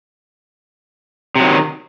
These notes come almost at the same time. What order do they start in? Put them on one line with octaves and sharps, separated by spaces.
C3 F#3 D#3